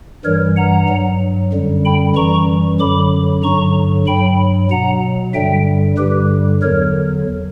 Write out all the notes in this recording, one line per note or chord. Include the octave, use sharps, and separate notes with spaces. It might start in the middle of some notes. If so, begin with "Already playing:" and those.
G2 E3 G3 A#4 C#5
F#5 A#5
G2 F#3
F#2 D3 G3
G5 B5
F#2 E3 G3 A#5 C#6
F#2 D3 F#3 B5 D6
G2 D3 F#3 A#5 C#6
G2 F#3 G5 B5
B2 F#3 F#5 A#5
G2 D3 G3 E5 G5
G2 D3 G3 G4 B4
E2 D3 F#3 A#4 C#5